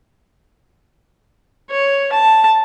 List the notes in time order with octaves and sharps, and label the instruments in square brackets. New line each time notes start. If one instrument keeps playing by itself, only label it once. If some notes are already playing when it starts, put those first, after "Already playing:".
[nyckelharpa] C#5
A5